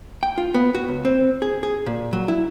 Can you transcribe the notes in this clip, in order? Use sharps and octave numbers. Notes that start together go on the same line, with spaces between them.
G5
F4
B3
F#4
C#2
C4
G#4
G#4
A#2
F#3
E4